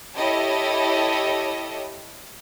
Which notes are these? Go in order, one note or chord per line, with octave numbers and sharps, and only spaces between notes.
E4 G4 A4 C#5 D#5